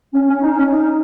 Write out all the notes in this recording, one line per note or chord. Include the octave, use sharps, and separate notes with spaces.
C#4
C#4
D#4
C#4
D#4